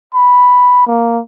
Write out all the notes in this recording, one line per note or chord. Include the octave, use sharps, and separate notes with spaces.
B5
A#3